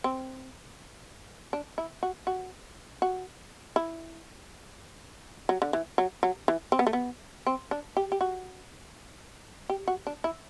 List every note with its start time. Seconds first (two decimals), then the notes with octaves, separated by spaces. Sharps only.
0.04 C4
1.53 D4
1.78 E4
2.03 F#4
2.27 F#4
3.02 F#4
3.76 E4
5.49 F#3
5.62 D3
5.73 E3
5.98 F#3
6.23 F#3
6.48 E3
6.72 C4
6.79 B3
6.87 A3
6.93 B3
7.47 C4
7.71 D4
7.97 G4
8.12 G4
8.21 F#4
9.70 G4
9.88 F#4
10.07 D4
10.24 E4